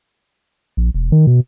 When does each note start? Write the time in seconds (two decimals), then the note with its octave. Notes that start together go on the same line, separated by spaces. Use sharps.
0.77 A#1
0.94 E1
1.12 D#3
1.27 B2